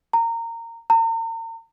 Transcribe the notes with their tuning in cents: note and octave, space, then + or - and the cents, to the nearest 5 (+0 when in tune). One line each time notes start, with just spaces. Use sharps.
A#5 -20
A#5 -40